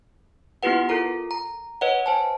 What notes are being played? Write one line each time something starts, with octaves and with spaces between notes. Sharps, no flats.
B3 E4 F4 G4 B4 F#5
F4 A4 A#4 A#5
A#5
B4 C#5 D#5 F#5
C5 G#5 A5